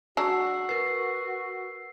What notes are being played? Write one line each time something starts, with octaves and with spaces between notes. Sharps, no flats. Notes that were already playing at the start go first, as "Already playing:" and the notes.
F#3 G#3 D4 F#4 E6 C7
A#4 B4 C7